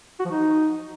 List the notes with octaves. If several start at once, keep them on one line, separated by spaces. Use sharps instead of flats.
F#4
F3
D#4